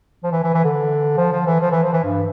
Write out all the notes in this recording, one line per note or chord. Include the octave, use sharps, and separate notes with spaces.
F3
E3
E3
E3
D3
F3
F3
E3
F3
E3
F3
E3
G2